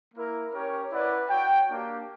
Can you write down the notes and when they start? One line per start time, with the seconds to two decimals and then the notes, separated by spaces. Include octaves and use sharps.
0.14 A#3 E4 A#4
0.52 C#4 G4 A#4 C#5
0.90 E4 B4 D5 F#5
1.29 F#4 C#5 G5
1.68 A#3 D4 G4